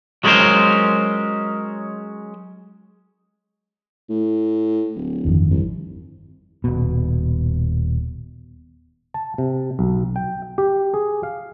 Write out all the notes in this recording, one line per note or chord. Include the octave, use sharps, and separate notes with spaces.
F#3 G#3 B3 C#4 A#4 C5
A2
D1
G1 F2 D#3
C2
D#1 B2
A5
C3
B1
G5
G4
G#4
F5